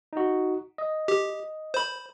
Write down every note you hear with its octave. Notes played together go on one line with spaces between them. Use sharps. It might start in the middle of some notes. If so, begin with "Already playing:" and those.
D#4 F#4
D#5
G4
C5 B5